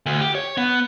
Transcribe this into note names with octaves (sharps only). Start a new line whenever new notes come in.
D2
G4
C#5
B3